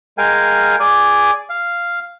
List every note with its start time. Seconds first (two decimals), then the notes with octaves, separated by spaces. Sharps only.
0.18 G#3 A#4 F5 G5 G#5
0.80 G#4 D5 G#5 D6
1.50 F5